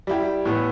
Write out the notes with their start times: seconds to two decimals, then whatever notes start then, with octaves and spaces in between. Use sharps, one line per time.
0.07 G3 E4 G4
0.45 A2 E3 B3